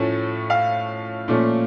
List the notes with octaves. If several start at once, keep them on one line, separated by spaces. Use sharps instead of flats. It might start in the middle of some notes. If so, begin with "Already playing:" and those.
Already playing: A2 F3 A3 C#4
F5
A#2 F3 A3 C#4